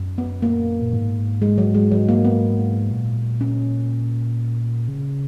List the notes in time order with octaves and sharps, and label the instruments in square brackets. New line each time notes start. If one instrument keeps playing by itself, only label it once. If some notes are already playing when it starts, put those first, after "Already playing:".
Already playing: [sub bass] F#2
[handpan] B3
A#3
[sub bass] A#2
G#2
[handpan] G#3
F#3
G#3
F#3
A#3
B3
[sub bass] A#2
[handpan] C#4
[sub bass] C#3